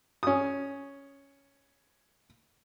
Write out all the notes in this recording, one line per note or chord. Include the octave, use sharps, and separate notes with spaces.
C#4 D#6